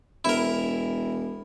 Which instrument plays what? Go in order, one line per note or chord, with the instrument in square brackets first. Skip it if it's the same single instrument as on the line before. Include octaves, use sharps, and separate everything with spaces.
[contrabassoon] E1 [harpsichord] E4 A#4